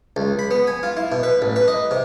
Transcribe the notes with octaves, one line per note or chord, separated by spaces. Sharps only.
C#2
B5
B3
G#5
F4
E4
B2
B4
A1
B4
D#5
C3